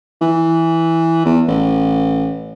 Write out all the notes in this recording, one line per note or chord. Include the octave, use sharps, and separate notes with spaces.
E3
E2
A1